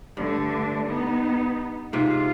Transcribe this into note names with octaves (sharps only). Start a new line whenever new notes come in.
G2 D3 A3 D4
B3 D#4
G#2 C3 F4 E5